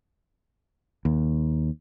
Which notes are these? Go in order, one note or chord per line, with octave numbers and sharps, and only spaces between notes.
D#2